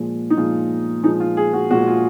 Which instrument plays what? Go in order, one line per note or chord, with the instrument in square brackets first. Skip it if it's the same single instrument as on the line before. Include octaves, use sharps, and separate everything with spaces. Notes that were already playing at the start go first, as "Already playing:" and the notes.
Already playing: [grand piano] A#2 F3 G#3
D#4
A#2 F3 G#3 F4
A#2 F3 G#3 D#4
F4
G#4
F#4
A#2 F3 G#3 F#4
F4